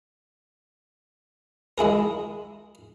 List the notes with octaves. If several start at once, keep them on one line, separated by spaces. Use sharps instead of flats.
G#3 E4 G#4 A#4